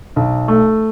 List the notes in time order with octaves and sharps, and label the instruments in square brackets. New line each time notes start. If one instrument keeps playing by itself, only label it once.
[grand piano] B1
A3